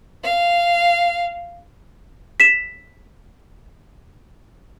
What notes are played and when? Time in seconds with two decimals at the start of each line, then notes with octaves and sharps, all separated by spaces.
0.23 F5
2.40 B6 E7